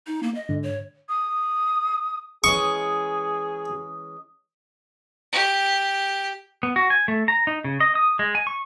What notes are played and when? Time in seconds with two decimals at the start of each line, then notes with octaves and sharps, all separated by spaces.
0.07 D#4
0.23 A#3
0.35 D#5
0.49 G#2 D3
0.63 C#5
1.09 D#6
2.44 E3 G#3 C#4 G#4 C#6 D#6
5.32 G4
6.63 B3
6.76 F#4
6.90 G#5
7.08 A3
7.28 A#5
7.47 D#4
7.64 C#3
7.80 D#5
7.95 D#6
8.19 G#3
8.35 G#5
8.47 C#6